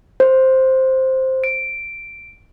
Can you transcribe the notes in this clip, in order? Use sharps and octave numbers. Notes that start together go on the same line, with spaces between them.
C5
D7